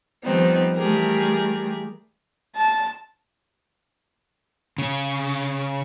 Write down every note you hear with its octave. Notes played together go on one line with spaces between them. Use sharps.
D#3 F3 G3 B3 C4 D#4
E3 G3 A3 G4 G#4 A#4
A5
C#3